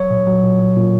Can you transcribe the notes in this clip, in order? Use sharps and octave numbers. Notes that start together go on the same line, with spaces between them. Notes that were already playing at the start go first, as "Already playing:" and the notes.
Already playing: F#3 C#5
A#2
F#3
A#2
F#3
A#2